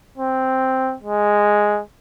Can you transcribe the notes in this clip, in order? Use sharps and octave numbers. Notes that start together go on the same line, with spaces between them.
C4
G#3